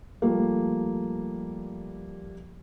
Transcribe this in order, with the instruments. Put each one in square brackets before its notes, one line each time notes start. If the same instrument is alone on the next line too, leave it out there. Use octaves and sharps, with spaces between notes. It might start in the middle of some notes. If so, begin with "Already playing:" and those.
[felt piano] F3 G3 A3 A#3